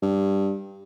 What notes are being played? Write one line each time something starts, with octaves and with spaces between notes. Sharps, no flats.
G2